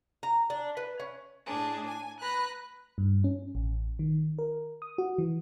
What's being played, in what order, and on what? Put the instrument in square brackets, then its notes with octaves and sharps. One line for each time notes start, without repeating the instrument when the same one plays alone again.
[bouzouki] A#5
D4
B4
C#4
[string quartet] A2 D4 G#4
G#5
B4 A#5 F#6
[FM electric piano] G2
C#4
A1
D#3
A#4
D#6
F#4
E3